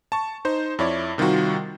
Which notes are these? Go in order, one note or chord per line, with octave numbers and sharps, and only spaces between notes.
A5 C#6
D#4 C5
F2 E4 C#5 D5
C3 D#3 G3 F4 F#4